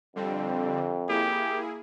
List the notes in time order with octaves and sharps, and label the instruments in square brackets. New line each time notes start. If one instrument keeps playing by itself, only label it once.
[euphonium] F2 [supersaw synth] D3 G3 C4
[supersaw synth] A#3 E4 G#4 [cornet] G4